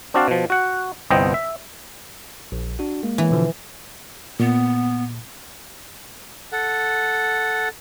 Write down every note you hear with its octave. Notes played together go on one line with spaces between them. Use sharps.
C4 D4 F#4 D5 F5
B2 F3
F#4 F#5
G1 C2 B3 C4 D#5 G5
E5
A#1
D4 F#4
G#3 A#3
E3
B2 D3 F3
A#2 B3
A4 F#5